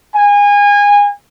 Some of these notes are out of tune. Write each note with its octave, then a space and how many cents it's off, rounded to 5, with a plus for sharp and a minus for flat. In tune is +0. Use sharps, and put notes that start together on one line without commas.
G#5 -25